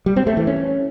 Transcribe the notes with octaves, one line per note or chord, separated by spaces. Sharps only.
G3
C4
A3
E3
C#4